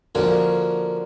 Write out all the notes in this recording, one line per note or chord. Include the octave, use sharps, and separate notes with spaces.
D3 F3 A#3 C#4 F#4 C#5